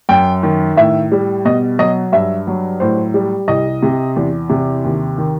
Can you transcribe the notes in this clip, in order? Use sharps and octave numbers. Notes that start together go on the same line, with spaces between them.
F#2 G5
D#3
A2 E5
G3
B2 D#5
F#3 D#5
G2 E5
F#3
A2 C5
G3
C2 D#5
C3
E2
C3
D#2
D#3